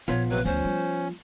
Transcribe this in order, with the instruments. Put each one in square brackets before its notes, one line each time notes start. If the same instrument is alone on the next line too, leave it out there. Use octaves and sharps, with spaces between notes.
[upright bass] A#1 [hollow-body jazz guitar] F3 B3 F4 [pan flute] C#5
[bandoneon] C3 F#3 [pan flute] B4
[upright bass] F#1 D2 [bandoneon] C#4 [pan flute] C5
[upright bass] G3